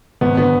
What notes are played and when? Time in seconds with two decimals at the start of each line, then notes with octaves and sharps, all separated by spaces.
0.21 G#1 B3
0.37 D3 B3